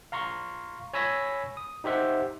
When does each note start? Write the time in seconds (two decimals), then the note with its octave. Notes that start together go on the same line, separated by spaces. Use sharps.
0.12 F5 A#5 C6 C#6
0.94 C#5 G#5 B5 E6 A#6 B6
1.57 D#6
1.84 D#4 G4 C5 E5 F#5